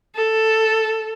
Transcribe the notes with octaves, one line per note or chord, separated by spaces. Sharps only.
A4